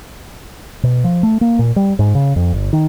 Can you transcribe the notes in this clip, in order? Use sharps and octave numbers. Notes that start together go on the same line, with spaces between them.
B2
F3
A3
A#3
A#2
G3
G#2
C#3
F2
G1
D#3